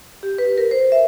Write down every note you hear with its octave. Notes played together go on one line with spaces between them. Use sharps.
G4
B4
A#4
C5
E5